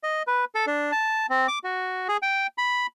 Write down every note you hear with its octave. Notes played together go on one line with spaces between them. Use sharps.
D#5
B4
A4
D4
A5
C4
D6
F#4
G#4
G5
B5